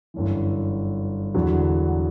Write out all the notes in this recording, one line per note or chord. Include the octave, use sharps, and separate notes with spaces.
G1 F#2 E3
E1 E2 D3 F#3